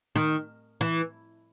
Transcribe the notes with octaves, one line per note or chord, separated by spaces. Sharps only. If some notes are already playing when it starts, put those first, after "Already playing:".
D#3
E3